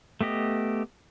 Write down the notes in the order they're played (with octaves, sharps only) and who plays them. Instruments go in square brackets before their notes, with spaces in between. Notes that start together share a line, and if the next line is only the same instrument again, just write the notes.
[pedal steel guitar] A3 B3 G4 D#5